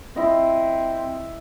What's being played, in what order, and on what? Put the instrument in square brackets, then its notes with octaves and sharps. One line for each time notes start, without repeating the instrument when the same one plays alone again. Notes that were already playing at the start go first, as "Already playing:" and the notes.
[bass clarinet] C4 [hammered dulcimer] E4 D#5